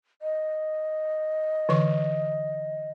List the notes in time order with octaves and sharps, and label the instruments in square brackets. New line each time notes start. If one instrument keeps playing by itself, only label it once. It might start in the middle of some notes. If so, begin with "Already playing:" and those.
[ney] D#5
[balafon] D3 E3 C#6